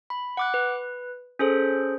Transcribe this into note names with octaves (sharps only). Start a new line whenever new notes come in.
B5
F#5 D6 F#6
B4
C#4 G#4 A4 C5